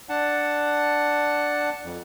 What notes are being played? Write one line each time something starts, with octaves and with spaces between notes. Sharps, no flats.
D4 F#5 A5
F2